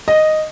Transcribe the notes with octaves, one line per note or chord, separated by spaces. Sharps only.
D#5